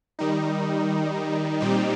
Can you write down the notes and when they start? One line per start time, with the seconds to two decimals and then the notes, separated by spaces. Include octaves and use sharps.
0.19 D#3 G3 D#4
1.60 A#2 G3 C4 D#4 G4